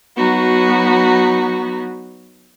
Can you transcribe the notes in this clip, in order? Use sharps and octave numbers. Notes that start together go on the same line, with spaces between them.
F#3 B3 D#4 F#4